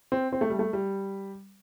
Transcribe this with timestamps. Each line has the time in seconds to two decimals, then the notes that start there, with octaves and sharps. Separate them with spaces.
0.12 C4
0.32 C4
0.41 A3
0.50 G3
0.59 A3
0.73 G3